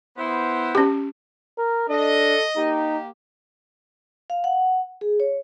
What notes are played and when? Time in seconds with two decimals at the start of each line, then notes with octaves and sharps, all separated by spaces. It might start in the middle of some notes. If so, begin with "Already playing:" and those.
0.18 B3 E4 C5
0.75 C#4 G4
1.58 A#4
1.89 D4 A4 D#5
2.57 A#3 D#4 G4
4.30 F5
4.44 F#5
5.01 G#4
5.20 C#5